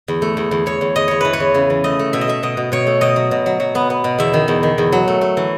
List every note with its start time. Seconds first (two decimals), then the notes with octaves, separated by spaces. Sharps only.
0.08 E2
0.22 A3
0.37 E2
0.51 E2
0.66 E2 C#5
0.81 E2
0.96 E2 D#5
1.08 E2 C#5
1.21 E3 B4
1.33 C#5
1.40 E2
1.54 C#3
1.70 E3
1.84 A3 D#5
1.99 A3
2.13 B2 E5
2.21 D#5
2.28 A3 E5
2.43 B2 D#5
2.57 B2
2.72 B2 C#5
2.87 A3
3.01 B2 D#5
3.16 F#3
3.31 B2
3.46 F#3
3.60 F#3
3.75 B3
3.90 B3
4.04 B2
4.19 E2 E5
4.33 D#3
4.48 E2
4.63 D#3
4.78 E2
4.92 F#3
5.08 A3
5.21 A3
5.37 E3